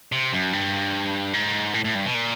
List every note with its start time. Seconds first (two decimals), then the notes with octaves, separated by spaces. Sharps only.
0.12 C3
0.33 F#2
0.53 G2
1.34 G#2
1.74 A2
1.84 A2
1.95 G2
2.06 B2
2.14 A#2